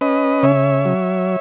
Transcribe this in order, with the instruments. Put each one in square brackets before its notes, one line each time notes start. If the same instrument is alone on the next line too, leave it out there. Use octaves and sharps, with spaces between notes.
[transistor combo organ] C#4 B4 D#5
C#3 C#5 E5
F#3